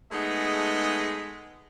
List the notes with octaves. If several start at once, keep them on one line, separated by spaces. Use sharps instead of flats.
G#3 A3 B3 D#4 G#4 D#5